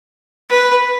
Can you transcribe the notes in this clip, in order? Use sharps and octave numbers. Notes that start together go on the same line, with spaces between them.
B4